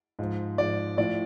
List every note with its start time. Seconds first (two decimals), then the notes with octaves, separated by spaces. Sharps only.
0.19 G#2 F3
0.58 G#2 F3 D5
0.97 A2 F3 D5